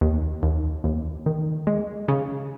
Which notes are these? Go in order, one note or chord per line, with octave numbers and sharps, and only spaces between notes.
D#2
D#2
D#2
D#3
G#3
C#3